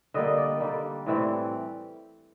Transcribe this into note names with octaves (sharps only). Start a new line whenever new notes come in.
D3 G3 A#3 D#5
D5
D3 G3 A#3
A2 E3 G3 C4